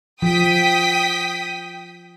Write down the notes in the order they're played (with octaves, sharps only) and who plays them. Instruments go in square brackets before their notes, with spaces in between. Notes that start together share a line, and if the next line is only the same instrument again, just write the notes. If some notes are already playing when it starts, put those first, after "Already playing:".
[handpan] F3 [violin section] G5 D#6 B6